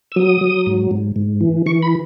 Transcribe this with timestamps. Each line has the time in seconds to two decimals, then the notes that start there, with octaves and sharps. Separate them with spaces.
0.12 E6
0.16 F#3 D#6
0.41 F#3
0.66 G#2
0.91 G#2
1.16 G#2
1.41 E3
1.66 E3 C#6
1.82 B5